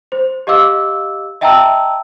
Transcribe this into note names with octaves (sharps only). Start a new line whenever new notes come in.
C5
G4 D#5 F5 D6 E6
D#5 E5 G5 A5 A#5 E6